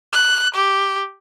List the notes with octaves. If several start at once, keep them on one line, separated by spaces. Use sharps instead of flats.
F#6
G4